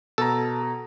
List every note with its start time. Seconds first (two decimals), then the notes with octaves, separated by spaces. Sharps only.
0.18 B2 A4 A#5